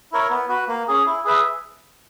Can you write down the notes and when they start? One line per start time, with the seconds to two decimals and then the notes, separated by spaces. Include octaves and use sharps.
0.12 E4 A#4 C#5
0.31 B3
0.49 F#4 B4
0.68 A#3
0.88 C#4 G#4
1.06 E4
1.25 G#4 B4 E5